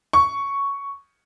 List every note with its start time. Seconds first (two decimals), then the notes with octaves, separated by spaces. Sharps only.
0.13 C#6